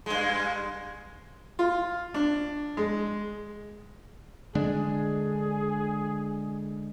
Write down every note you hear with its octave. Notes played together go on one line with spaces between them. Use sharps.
G2 G#3
F4
D4
G#3
D3 G#3 D4 G#4